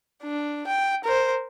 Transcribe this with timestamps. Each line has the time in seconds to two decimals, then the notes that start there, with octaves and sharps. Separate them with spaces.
0.23 D4
0.67 G5
1.04 A#4 C5